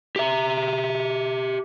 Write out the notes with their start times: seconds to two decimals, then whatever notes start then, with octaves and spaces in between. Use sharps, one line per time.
0.16 G4 E5